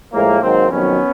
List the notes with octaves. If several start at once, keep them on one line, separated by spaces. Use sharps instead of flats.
A2 F3 G#3 A#3
G#2 D#3 F#3 A#3 C4
F2 C3 D#3 F#3 B3 C#4